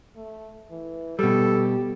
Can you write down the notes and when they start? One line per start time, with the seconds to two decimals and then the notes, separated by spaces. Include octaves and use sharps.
0.16 A3
0.70 E3
1.19 B2 G3 G4 A4